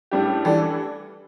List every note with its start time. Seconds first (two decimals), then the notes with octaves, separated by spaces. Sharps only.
0.11 A2 G3 D4 G4
0.45 D3 E3 G3 D4 A4